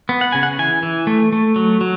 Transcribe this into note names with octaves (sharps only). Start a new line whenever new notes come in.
B3
F#5
C#3 G#5
F#5
E3 G#5
E3
A3
A3
F#3
F#3